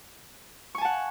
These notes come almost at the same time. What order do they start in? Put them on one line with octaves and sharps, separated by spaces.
C#6 G#5 A5 F#5